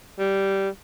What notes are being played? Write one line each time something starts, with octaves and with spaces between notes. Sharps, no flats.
G3